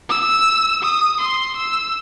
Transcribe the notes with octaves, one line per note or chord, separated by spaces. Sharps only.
E6
D#6
C6
E6